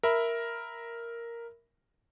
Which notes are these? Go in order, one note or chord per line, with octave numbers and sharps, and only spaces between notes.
A#4 E5 B5